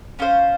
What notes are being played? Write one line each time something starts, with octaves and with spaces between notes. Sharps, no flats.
C#4 F4 C5 F5